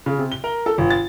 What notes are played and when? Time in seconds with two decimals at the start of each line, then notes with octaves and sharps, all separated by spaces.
0.06 C#3
0.19 C3
0.32 G7
0.44 A#4
0.66 A4
0.78 G1
0.90 A6